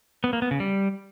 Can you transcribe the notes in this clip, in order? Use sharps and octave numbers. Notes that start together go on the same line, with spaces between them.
B3
A#3
B3
C#3
G3